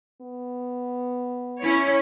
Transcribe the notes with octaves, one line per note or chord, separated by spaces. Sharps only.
B3
C#4 E4 C#5